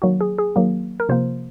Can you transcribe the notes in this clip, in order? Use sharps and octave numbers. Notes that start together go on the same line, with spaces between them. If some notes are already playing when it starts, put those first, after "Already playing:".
D#3 F#3 A#3 F#4
G#4
G#4
D#3 F#3 A#3
A#4
C3 F3 A#3 C5